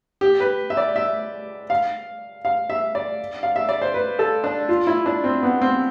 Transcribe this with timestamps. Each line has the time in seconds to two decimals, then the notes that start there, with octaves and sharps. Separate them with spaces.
0.21 G4
0.40 B4
0.70 E5
0.77 D5
0.96 E5
1.70 F5
2.45 F5
2.70 E5
2.95 D5
3.43 F5
3.56 E5
3.69 D5
3.82 C5
3.94 B4
4.19 A4
4.44 D4
4.69 F4
4.87 E4
5.06 D4
5.24 C4
5.43 B3
5.62 C4